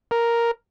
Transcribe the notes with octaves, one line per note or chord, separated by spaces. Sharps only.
A#4